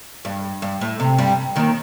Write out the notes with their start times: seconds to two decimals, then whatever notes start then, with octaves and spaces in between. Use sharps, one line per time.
0.25 G2
0.62 G2
0.81 A2
1.00 C3
1.18 G2 G3
1.56 D#2 D#3